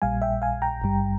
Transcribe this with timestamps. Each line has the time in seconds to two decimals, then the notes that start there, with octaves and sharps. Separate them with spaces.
0.02 A#1 A#2 G3 F5 G#5
0.22 E5 G5
0.42 F5 G#5
0.62 G5 A#5
0.82 G#1 G2 G3